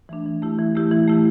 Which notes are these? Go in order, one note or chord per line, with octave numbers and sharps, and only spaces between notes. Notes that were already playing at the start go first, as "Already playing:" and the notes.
E3 A3 D4
E3
A3 E4 G4
E3
A3 E4 G4
E3
A3 E4 G4